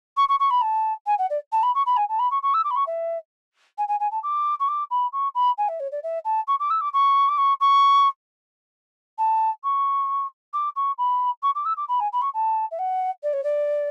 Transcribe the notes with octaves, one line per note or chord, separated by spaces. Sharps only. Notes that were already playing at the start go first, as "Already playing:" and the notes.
C#6
C#6
C#6
B5
A5
G#5
F#5
D5
A5
B5
C#6
B5
G#5
A5
B5
C#6
C#6
E6
D6
B5
C#6
E5
G#5
G#5
G#5
A5
D6
C#6
D6
B5
C#6
B5
G#5
E5
C#5
D5
E5
A5
C#6
D6
E6
D6
C#6
D6
C#6
C#6
A5
C#6
D6
C#6
B5
C#6
D6
E6
D6
B5
G#5
B5
C#6
A5
E5
F#5
D5
C#5
D5